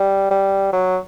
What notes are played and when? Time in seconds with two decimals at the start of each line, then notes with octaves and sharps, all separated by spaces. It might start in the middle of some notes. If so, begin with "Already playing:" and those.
Already playing: G3
0.31 G3
0.73 F#3